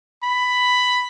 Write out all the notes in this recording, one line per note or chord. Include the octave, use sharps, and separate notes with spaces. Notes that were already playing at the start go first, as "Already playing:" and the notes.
B5